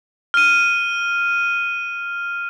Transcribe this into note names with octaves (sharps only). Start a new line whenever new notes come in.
F6 D#7